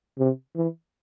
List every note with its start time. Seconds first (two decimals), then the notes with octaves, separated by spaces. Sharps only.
0.19 C3
0.56 E3